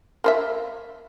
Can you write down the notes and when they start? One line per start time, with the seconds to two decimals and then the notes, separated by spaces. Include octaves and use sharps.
0.24 A#3 C5 E5